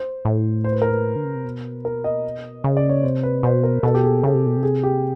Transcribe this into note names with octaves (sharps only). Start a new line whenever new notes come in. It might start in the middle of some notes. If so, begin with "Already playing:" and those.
Already playing: C5
A2
C5
B4
A#4
B4
D3
C#3
C3
B2
A#4
D#5
C#3
D5
C#5
C3 C5
B4
B2 C5
A#4
B2 A4
G4
G#4
C#3 A4
C3
B2
C3
G#4
G4